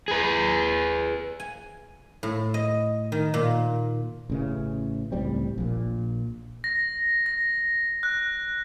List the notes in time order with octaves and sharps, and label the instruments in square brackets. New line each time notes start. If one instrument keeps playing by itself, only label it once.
[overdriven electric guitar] G#4 B4
[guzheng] G#5
A2
D#5
D#3
A#2
[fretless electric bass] A1 C#3 E3
C#2 A2 G3 C4
A#1 A#2
[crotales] A#6
A#6
F#6